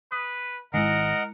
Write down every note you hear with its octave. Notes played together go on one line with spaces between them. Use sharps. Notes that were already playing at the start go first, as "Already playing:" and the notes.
B4 D#6
G#1 D#3 G#3 E4 A#4 D#5 F#5